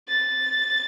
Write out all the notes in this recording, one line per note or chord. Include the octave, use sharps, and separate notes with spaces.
A6